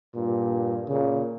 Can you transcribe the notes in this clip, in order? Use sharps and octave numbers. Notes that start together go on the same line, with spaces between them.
G2 A#2
A#2 C#3